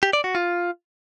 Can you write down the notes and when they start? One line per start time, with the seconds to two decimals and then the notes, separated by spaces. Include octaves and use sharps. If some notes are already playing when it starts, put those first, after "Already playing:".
0.03 G4
0.13 D5
0.24 F#4
0.35 F4